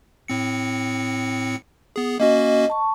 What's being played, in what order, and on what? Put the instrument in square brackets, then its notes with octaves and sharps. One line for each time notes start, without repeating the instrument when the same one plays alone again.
[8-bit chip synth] A2 C4 C#7
B3 G#4
[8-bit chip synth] A#3 C#4 F#4 [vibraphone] D#5
[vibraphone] A5 C#6